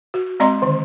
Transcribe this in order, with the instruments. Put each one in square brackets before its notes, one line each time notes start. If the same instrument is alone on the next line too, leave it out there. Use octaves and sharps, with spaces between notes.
[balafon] F#4
G#3 C4 D5 D#5 A#5 C6
D3 D#3